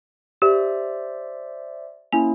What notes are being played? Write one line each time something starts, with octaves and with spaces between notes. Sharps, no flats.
G4 C5 D5 E5
A#3 C#4 E4 G#5